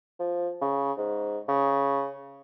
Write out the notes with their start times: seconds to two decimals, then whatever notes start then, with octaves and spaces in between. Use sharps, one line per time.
0.20 F3
0.61 C#3
0.97 G#2
1.49 C#3